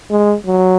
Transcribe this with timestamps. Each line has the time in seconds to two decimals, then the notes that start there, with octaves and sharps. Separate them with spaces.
0.11 G#3
0.47 F#3